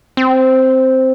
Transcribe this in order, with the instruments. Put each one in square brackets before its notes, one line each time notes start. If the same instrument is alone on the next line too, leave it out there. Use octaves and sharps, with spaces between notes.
[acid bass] C4